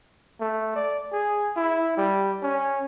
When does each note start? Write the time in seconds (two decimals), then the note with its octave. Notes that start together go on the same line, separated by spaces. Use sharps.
0.41 A3
0.76 D5
1.12 G#4
1.56 E4
1.97 G3
2.43 C#4